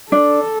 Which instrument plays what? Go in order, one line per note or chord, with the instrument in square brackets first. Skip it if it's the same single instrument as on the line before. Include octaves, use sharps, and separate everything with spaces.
[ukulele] D4 [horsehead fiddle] A4